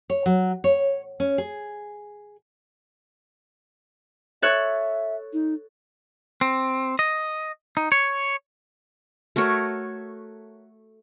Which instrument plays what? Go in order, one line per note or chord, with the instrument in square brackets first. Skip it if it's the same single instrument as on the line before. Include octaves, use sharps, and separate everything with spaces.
[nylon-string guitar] C#5
F#3
C#5
C#4
G#4
[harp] A4 C#5 F#6 [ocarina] E5
[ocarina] D#4
[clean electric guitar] C4
D#5
D#4
C#5
[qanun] A3 F#4 A#4 C#5